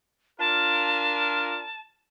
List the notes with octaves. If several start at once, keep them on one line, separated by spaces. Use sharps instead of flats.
D4 F4 A#4 A5